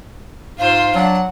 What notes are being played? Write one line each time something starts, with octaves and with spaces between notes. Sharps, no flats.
G#2 F4 C5 F5
F#3 D4 F#5